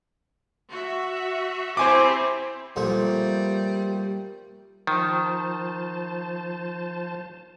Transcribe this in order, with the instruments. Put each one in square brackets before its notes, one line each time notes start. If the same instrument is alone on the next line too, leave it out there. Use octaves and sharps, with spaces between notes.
[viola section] F#4 E5
[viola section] C4 E4 G4 [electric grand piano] C5 G#5 D6
[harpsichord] A#2 F3 A3 [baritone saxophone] G3
[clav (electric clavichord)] D#3 [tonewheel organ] F3 C5 A5